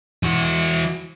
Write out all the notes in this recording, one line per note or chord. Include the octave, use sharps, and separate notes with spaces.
E3 F#4